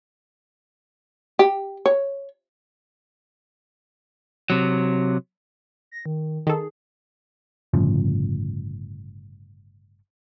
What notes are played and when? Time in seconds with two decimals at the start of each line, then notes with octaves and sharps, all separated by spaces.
1.39 G4
1.86 C#5
4.50 C3 F#3
5.92 A#6
6.06 D#3
6.47 D#3 G#4 A4
7.74 G1 A2 C#3 F3